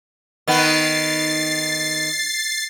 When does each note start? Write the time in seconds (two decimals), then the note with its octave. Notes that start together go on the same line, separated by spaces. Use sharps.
0.48 D#3 B3 A6 C7